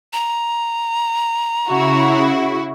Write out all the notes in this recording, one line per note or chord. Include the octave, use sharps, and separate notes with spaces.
A#5
C#3 E4 F#4